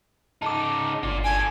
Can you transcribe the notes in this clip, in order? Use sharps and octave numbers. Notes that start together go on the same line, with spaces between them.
C#3 D#4 A5 D6
G1 F4 D5
G4 A4 G#5